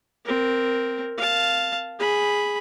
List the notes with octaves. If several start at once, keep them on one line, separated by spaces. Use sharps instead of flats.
C4 A#4
F5 A5
G#4 B5